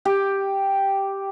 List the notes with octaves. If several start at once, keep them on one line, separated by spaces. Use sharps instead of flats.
G4